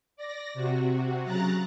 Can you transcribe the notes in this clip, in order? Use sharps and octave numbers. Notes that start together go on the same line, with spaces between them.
D5 A#6
C3 F#4
C#3 F#3 A#5 F#6 A6